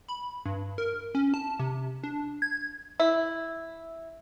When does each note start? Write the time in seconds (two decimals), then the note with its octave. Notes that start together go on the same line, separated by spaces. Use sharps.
0.08 B5
0.46 G2
0.78 A#4
1.15 C#4
1.34 A5
1.59 C3
2.04 D4
2.42 G#6
3.00 E4